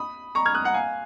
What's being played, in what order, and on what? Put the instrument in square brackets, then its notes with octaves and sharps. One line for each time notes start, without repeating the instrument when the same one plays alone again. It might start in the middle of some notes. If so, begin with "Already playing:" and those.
Already playing: [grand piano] B5 D#6
A#5 C#6
F6 G#6
D#6 F#6
F#5 A#5
F5 G#5